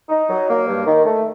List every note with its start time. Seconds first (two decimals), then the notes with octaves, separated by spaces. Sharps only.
0.09 D#4
0.29 F#3
0.49 A#3
0.67 G2
0.86 D#3
1.06 A3